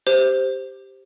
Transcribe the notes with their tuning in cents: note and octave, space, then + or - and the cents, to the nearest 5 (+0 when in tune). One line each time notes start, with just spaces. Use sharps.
G4 +0 C5 +0